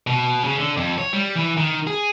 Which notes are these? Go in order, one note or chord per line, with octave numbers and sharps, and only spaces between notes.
B2
C#3
D3
F2
C#5
G3
E3
D#3
G#4